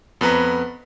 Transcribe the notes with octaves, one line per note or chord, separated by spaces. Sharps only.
F2 B3 B4 A#5